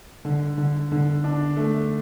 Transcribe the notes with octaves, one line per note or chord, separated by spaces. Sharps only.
D3
D3
D3
D4
A3